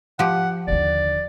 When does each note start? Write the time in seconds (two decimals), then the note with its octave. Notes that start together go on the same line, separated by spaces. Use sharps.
0.19 F3 G4 F#5
0.67 D#2 D3 D5